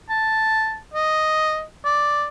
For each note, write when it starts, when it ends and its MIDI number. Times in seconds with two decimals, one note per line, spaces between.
0.10 0.78 81
0.94 1.63 75
1.85 2.27 74